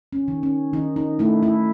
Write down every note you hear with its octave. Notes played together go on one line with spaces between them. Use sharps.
C#4
D#3
C#4
D#3 D#4
D#4
A3 E4
E4